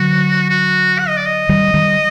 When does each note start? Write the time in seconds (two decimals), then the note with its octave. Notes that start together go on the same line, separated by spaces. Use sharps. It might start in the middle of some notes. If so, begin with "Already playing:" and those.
Already playing: D3 F#3 F#4
0.50 F#4
0.99 F#5
1.08 D#5
1.17 D5
1.26 D#5
1.49 D#3 G3
1.74 D#3 G3